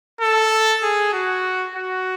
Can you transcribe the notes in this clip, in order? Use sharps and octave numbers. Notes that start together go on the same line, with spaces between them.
A4
G#4
F#4
F#4